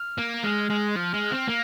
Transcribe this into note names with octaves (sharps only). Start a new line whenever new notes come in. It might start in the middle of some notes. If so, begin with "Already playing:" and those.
Already playing: F6
A#3
G#3 F6
G#3
F3 F6
G#3
C4
A#3